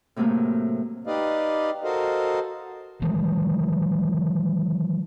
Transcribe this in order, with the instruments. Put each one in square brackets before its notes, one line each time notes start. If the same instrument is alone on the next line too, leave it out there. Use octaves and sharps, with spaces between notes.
[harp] A2 C3 F#3 A3 A#3
[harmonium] D#4 G4 B4 D5 D#5 F5
F#4 A4 A#4 C5 D#5 F5
[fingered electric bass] D#3 E3 F#3 G#3